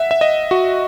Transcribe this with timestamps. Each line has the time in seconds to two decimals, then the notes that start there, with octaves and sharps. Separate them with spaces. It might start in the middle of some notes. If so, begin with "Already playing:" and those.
Already playing: E5 F#5
0.11 E5
0.21 D#5
0.51 F#4